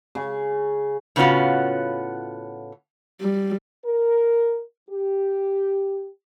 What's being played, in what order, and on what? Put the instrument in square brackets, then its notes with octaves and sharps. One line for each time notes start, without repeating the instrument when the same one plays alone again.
[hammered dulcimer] C#3
[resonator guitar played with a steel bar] A2 C#3 B3 C#4 F4 F#4
[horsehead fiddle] G3
[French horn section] A#4
G4